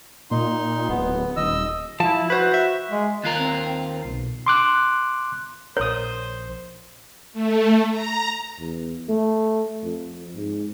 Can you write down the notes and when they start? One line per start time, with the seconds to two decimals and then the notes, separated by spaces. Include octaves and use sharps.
0.31 A#2 D#4 C6
0.89 D1 B3
1.37 D#1 D#5 E6
2.00 F3 E4 A5
2.30 F#4 B4 C5
2.54 E5
2.90 G#3
3.24 D#2 F4 A#4 F#6
3.39 C4
4.04 B1
4.46 C6 D6 F#6
5.77 A#1 D4 A#4 C5 C#5 D#6
7.33 A3
7.91 A#5
8.59 E2
9.09 A3
9.83 F2
10.36 G#2